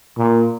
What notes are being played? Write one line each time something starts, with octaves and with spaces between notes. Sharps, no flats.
A#2